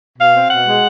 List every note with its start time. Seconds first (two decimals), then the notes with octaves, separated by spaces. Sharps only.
0.17 B2 F5
0.33 C4
0.50 B2 F#5
0.66 G#3